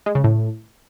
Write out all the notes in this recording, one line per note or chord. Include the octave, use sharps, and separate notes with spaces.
G#3
C#3
A2